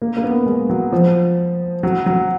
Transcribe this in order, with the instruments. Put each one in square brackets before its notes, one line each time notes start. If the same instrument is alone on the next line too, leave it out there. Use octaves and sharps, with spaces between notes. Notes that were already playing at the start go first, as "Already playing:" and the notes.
[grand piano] A#3
A#3
B3
G#3
F#3
F3
F#3
F#3